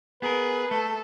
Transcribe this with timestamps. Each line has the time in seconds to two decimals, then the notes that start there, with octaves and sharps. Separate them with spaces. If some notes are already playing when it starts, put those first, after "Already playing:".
0.22 B3 G#4 A#4 B4
0.71 A3 A4